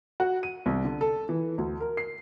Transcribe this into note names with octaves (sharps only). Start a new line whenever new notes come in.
F#4
D#7
C2
D3
A4
E3
D2
A#4
C7